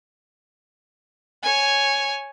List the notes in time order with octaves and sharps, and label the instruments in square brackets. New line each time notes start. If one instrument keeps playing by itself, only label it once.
[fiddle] C#5 G#5